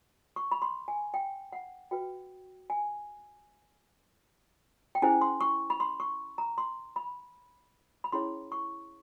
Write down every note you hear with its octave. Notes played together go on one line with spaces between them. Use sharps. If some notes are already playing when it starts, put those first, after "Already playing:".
C#6
B5
C6
G#5
G5
F#5
F#4 B4 G5
G#5
G5
C#4 E4 G#4 C5 G#5
C6
C#6
B5
C6
C#6
A#5
C6
B5
B5
C#4 E4 G#4 C#5 C6
C#6